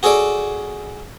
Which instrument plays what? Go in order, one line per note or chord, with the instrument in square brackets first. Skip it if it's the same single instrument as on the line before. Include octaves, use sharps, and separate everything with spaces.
[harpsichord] F#4 G#4 A4 C#5 D5